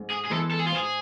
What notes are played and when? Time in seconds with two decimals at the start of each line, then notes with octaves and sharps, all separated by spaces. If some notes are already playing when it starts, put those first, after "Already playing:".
Already playing: G#2
0.10 G#4
0.25 G#4
0.30 E3 G#3 B3 A4
0.51 A4
0.59 G#4
0.66 F4
0.71 G#2 G#4